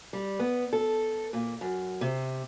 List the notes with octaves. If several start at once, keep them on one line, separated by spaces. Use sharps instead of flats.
G3
B3
A4
A#2
F#2
C3